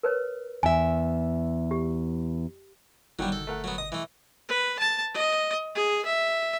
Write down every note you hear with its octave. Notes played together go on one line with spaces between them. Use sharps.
A#4 B4 C#5
E2 E5 G#5
G4
G1 D#3 F#3 G3 F#4 G5
A4
A3 A#4 F#5
F#3 B3
D#5 D#6
E3 A3
B4
A5
D#5
G#4
E5